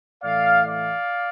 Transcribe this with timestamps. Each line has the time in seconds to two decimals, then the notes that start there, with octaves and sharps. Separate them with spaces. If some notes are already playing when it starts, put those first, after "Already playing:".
0.23 A2 E3 A3 D5 F5
0.66 D5 F5